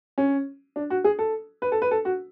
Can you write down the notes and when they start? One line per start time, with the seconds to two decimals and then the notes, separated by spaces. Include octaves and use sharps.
0.18 C#4
0.76 D4
0.90 F#4
1.04 G#4
1.19 A4
1.62 B4
1.72 A4
1.82 B4
1.91 A4
2.05 F#4